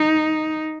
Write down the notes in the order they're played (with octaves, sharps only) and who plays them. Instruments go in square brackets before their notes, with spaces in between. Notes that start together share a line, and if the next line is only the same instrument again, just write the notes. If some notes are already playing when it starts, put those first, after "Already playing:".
Already playing: [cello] D#4